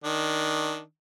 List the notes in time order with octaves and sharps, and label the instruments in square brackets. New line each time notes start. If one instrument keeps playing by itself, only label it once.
[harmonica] D#3 D4